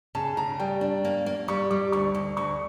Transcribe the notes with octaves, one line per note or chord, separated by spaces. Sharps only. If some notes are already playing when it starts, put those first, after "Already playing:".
C#3 A5
C#3 A#5
G3 G5
D4
A#3
A#3
G3 C#6
G3 D6
D2 C#6
D2
D2 C#6